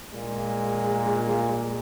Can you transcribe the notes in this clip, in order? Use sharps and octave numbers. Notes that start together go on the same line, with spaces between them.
A#2 G#3